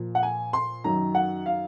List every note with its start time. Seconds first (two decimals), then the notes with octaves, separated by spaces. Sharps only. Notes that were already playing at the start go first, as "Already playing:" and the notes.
Already playing: A#2 F3
0.15 F#5
0.23 G#5
0.53 C6
0.84 F#2 D#3 F#3 A#5
1.15 F#5
1.46 F5